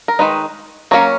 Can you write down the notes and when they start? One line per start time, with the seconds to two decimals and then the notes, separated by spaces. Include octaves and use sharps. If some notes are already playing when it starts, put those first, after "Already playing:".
0.08 A#4
0.19 D#3 G#3 D#4 B4
0.91 F#3 A#3 C#4 C#5